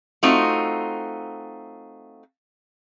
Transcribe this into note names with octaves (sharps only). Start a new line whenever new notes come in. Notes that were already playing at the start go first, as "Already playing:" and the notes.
A3 C4 D#4 F4 F#4